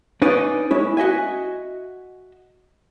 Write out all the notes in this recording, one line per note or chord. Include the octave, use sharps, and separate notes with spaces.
C#4 D#4 B4 D5 D#5
G#3 C#4 E4
F#4 D#5 E5 G#5